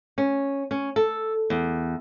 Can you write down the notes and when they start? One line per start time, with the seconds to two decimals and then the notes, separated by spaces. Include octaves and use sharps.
0.18 C#4
0.71 C#4
0.96 A4
1.50 E2